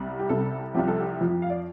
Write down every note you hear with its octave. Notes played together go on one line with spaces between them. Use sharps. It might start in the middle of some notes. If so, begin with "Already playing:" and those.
Already playing: C2 C3 G3
G4
C2 C3 G3 A4
C2 C3 F3 G4
A4
G4
F2 F3
F5
D5